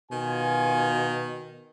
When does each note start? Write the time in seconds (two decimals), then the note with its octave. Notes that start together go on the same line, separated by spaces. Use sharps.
0.12 B2 D#3 F4 G#5